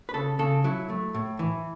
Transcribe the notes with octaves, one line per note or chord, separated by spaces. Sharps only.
B4
C#3 A4
C#3 A4
F#3 E4
A3
A2
E3